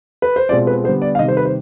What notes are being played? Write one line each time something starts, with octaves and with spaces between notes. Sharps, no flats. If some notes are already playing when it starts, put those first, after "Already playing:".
B4
C5
B2 G#3 C4 F4 D5
B4
D3 G3 B3 C5
D5
F5
C3 D#3 G3 D#5
C5
B4
C5